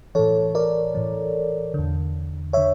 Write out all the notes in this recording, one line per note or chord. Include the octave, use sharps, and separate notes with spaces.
A2 E3 A4 C#5
A#4 D5
A2 E3
E2 D3
D3 C#5 E5